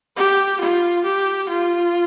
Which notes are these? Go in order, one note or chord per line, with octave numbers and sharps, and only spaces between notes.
G4
F4
G4
F4